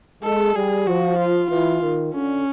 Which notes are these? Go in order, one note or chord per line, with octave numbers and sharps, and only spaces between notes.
G#3 A4
G3 G#4
F3 F#4
F4
E3 F4
D#3
D3 C#4